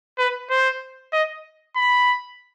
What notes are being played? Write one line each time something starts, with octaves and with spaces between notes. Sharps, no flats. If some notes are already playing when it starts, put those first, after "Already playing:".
B4
C5
D#5
B5